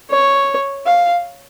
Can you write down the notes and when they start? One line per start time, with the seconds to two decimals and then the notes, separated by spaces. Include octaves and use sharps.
0.10 C#5
0.86 F5